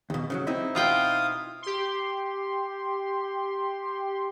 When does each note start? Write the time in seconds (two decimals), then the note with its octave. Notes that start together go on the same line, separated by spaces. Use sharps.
0.10 D#2 B2
0.30 C#3 E3 F#3
0.47 C4 D#4 E4
0.75 B2 F4 F5 G5 D#6
1.62 G4 C6